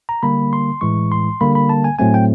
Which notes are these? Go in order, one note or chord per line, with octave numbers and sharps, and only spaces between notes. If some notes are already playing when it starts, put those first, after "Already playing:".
A#5
D3 G3 A#3 B5
C6
A2 E3 G#3 C#6
C6
D3 G3 A#3 B5
B5
A5
G#5
A2 F#3 A3 C4 G#5
G5